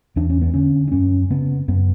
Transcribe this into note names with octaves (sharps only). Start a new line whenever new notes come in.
E2 D4
C#4
B3
D3 C#4
D4
F#2 C#4
C#3 B3
F#2 B3